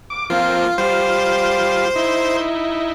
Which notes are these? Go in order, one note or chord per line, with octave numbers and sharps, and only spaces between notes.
D6
F3 A#3 C4 F4
G3 F4 C5
D#4 E4